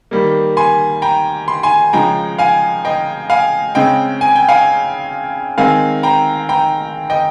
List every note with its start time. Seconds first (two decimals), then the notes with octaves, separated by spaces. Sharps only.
0.11 D#3 G3 A#3
0.57 G#5 C6
1.02 G5 A#5
1.48 C6
1.63 G#5 C6
1.93 C#3 F3 G#3 G5 A#5
2.38 F5 G#5
2.85 D#5 G5
3.30 F5 G#5
3.75 C#3 G#3 C4 D#5 G5
4.21 G#5
4.35 G5
4.48 F5 G#5
5.58 D#3 G#3 C4 F5 G#5
6.03 G5 A#5
6.49 G5 A#5
7.10 D#5 G5